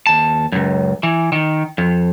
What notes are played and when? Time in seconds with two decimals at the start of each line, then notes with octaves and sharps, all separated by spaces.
0.07 D#2 A5
0.52 C#2 F#2
1.03 E3
1.32 D#3
1.78 F2